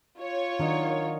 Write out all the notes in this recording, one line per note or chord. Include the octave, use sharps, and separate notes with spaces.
F4 C#5
D#3 F#3 D4 A#4 D#5